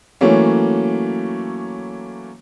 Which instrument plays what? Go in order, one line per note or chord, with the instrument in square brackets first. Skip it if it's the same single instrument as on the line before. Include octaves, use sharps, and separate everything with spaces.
[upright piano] E3 F#3 A3 A#3 C#4